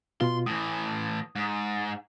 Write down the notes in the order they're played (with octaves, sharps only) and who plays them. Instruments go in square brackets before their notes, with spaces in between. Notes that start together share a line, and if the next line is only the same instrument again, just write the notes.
[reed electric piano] B2 F4 [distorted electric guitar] C6
[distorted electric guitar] A2 E3 [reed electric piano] D#6
[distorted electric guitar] G#2